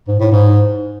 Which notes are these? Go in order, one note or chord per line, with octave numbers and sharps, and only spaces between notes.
G#2
A2
G#2